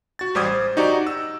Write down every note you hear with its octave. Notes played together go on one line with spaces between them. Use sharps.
F#4 A6
A1 G3 C5 D6 D#6 G#6
C5
D#4 F#4 G4 D5 A#5
E6